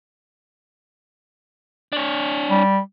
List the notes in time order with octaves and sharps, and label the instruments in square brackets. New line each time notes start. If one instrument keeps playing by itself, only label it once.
[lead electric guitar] D4 C#5
[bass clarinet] G3